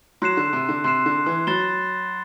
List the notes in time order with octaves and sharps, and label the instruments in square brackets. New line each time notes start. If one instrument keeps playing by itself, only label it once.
[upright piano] F#3 [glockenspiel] C6 F#6 C7 E7
[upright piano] D3
C3
D3
[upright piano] C3 [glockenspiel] C6 F#6 C7 E7
[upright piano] D3
E3
[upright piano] F#3 [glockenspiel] B5 F#6 A6 E7 G7